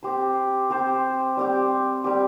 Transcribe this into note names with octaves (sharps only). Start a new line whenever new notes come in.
C4 G4 C5
C4 G4 C5
G3 C4 G4
G3 C4 G4